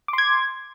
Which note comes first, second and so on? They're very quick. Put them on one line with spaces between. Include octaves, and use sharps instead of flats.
D6 C6 G#6